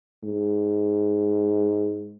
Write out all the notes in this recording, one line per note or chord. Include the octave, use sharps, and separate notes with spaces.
G#2